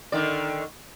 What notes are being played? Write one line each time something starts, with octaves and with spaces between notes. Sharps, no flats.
D3 D#3 D5